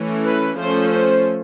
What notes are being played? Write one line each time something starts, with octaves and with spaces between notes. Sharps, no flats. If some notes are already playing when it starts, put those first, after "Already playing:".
Already playing: E3 A3 C#4
B4
F3 A3 C#4 C5
C5